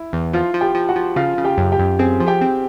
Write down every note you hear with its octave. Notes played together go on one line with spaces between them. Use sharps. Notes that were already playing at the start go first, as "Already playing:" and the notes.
Already playing: E4
E2
F3 F4 F5
F3
G4 G5
F3
F#4 F#5
F3
C#3 F4 F5
C#3
G4 G5
F#2
G4 G5
F#2
C4 G#4 G#5
F3
G4 G5
C4